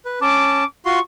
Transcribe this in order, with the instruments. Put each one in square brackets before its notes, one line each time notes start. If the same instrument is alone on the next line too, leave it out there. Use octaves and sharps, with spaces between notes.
[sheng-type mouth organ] B4
[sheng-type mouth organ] C#4 A5 [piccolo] D6
[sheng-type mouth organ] F4 F#4 C6 [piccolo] C#6